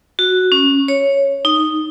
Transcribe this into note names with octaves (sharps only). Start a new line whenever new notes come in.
F#4
C#4
C#5
D#4